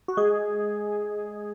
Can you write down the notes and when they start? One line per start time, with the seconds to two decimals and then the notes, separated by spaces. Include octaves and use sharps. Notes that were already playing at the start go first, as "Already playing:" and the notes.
0.08 F#4
0.17 G#3 G#4